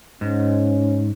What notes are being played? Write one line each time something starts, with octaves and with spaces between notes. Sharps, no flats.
G#2 C#4